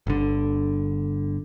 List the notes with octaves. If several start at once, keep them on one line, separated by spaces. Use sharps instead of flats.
G1 D3